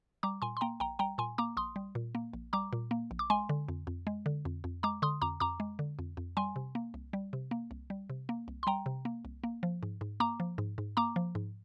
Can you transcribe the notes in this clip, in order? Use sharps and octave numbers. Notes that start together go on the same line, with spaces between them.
G3 A#5 D6
A#2 G#5 C6
C6
A#3 G5 A#5
A#1 G5 A#5
G3 G5 A#5
A#2 G#5 C6
A#3 A#5 D6
A#1 C6 D#6
G3
A#2
A#3
A#1
G3 A#5 D6
A#2
A#3
A#1
D6
G#3 G#5 C6
D3
F2
F2
G#3
D3
F2
F2
G#3 A#5 D6
D3 C6 D#6
F2 A#5 D6
F2 A#5 D6
G#3
D3
F2
F2
G3 G#5 C6
C3
A#3
C2
G3
C3
A#3
C2
G3
C3
A#3
C2
C6
G3 G5 A#5
C3
A#3
C2
A#3
F3
G#2
G#2
A#3 A#5 D6
F3
G#2
G#2
A#3 A#5 D6
F3
G#2